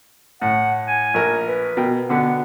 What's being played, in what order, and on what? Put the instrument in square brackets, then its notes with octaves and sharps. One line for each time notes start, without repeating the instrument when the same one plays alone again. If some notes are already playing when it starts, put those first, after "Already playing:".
[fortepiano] A2 [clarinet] F#5
[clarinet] G#5
[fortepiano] A#1 A#4
[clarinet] B4
[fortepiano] B2 A#4 G5
[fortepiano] B2 D3 B3 [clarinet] F#5